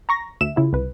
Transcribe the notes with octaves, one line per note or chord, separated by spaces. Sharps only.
A#5 C#6 A#6
D2 E5 E7
C#3 E4 F4
C2 B4